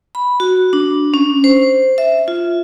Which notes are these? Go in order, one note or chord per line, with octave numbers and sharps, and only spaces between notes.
B5
F#4
D4
C#4
C5
E5
F4